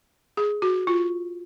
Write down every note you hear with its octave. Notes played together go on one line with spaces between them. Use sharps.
G#4
F#4
F4